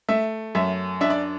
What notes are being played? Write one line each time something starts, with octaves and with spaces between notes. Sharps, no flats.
A3 E5
F#2 E5
D4 E5
D5